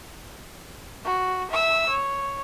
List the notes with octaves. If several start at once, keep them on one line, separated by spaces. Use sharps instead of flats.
F#4
E5 E6
C#5